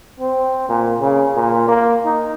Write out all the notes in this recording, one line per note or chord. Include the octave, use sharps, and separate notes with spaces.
C4
A#2
C#3
A#2
A#3
D#4